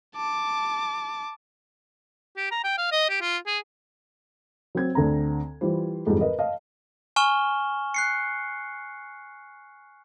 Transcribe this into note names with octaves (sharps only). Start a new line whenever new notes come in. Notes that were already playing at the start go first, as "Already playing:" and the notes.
A5 D6
G4
A#5
G5
F5
D#5
G4
F4
G#4
F#3 C4 G#6
D2 D3 C4 A#5
E3 G3 F4 C5
F2 G#2 E3 G3
A#4 B4 D#5
D#5 F5 A5
G#5 C#6 F6 E7 G7
F#6 C7 C#7